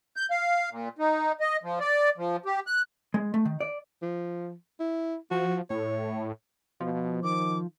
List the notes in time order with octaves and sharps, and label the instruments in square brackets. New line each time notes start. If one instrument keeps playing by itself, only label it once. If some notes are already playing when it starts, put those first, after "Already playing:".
[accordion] G6
F5
A#2
D#4
D#5
F3
D5
F3
G4
F#6
[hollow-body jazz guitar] G#3
A3
D#3
D5
[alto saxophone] F3
E4
[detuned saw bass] F3 [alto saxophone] F#4
[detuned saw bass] A2 [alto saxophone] C#5
[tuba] B2 [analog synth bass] F3
[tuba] D#3 [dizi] D6